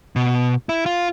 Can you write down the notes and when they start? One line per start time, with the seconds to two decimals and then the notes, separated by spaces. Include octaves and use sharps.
0.16 B2
0.69 E4
0.86 F4